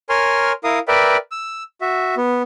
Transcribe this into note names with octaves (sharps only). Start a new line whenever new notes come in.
A#4 C#5 G#5 C6 F6
E4 A#4 F5 D#6
A#4 B4 D5 E5 G5
E6
F#4 E5
B3